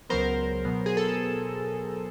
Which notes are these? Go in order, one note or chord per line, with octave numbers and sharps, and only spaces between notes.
C#2 C#3 F#3 B3 A#4 C5
B2 F#3 B3
G#4
A4